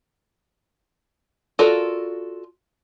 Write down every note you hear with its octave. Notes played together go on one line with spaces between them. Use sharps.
F4 F#4 A4 A#4 D5